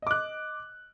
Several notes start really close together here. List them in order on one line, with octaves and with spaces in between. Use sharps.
D#5 D6 F#6